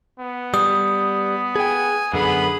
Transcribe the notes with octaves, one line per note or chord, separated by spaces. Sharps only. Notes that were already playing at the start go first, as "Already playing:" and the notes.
B3
G3 D#6
G#4 G5 G#5
F#2 D3 B3 G#4 B5